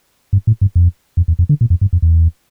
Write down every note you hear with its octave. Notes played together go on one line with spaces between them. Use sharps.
G2
A2
G2
F2
F2
E2
F2
D3
A#2
F2
G2
F2
E2